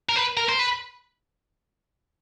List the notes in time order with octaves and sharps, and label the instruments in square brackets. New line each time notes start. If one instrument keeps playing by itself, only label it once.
[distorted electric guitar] A#4
B4
A#4
C5
B4